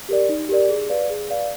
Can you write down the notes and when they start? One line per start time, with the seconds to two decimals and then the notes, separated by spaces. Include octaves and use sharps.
0.09 G4 A#4 D5
0.29 D#4
0.49 G4 A#4 D5
0.69 G#4
0.89 B4 D5 F5
1.10 G#4
1.29 B4 D5 F5